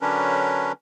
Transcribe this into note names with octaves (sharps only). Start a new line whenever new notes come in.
D3 F#3 C#4 D4 A#4 B4